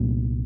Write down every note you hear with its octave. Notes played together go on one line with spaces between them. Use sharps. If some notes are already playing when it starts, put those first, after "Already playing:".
Already playing: C2 A#2